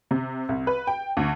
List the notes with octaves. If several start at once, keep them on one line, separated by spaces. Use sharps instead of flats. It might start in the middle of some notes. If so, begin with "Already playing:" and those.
C3
C2
B4
G5
D2